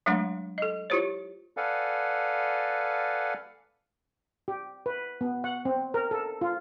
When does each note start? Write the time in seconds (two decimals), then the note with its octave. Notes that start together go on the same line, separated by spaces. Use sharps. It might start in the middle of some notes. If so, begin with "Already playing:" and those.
0.06 F#3 G#3 A3 D4 F#5 C6
0.58 A4 D#5
0.90 E4 F4 G4 C5 C#5
1.57 A4 B4 D5 F5 F#5 G#5
4.48 G4
4.86 B4
5.21 B3
5.44 F#5
5.65 C4
5.94 A#4
6.11 A4
6.41 F4